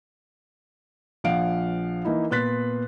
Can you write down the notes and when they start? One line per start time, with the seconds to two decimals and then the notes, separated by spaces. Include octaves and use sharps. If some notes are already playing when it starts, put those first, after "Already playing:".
1.24 A#1 F3 F5 F#5 D7
2.04 E3 A#3 D#4 E4
2.31 A#2 B3 C6 F#6 A6 B6